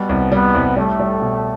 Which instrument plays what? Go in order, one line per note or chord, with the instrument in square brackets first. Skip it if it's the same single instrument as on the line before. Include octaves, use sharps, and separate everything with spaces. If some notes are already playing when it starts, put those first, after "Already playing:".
Already playing: [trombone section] B2 B3 [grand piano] G3
[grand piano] C2
[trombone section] B2 B3 [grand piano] G3
[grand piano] C2
[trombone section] A2 A3 [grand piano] G3
[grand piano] G3
B2